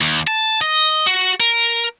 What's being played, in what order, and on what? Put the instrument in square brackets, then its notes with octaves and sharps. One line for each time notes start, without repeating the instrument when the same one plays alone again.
[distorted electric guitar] D#2
A5
D#5
F#4
A#4